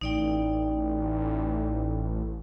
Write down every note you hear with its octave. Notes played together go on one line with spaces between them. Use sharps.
A1 D#4 D5 G5